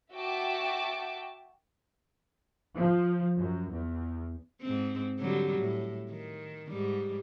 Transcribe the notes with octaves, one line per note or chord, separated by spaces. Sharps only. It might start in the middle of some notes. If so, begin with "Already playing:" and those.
F#4 E5 G5 A5 D6
F3
F#2
E2
G#2 C4
D3 F#3 G3
A2
D#3
G#2 G3